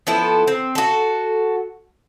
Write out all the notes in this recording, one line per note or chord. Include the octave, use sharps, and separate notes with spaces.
F3 B3 E4 A4
C4
F#4 A4